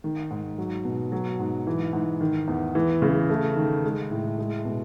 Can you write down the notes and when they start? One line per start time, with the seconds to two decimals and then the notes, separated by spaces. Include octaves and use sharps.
0.04 D#3
0.31 G#2
0.58 F#3
0.85 B2
1.12 F#3
1.39 G#2
1.67 E3
1.93 G#2
2.21 D#3
2.48 E2
2.75 E3
3.02 C#3
3.29 A3
3.56 D#3
3.84 G#3
4.11 A2
4.39 G#3
4.65 B2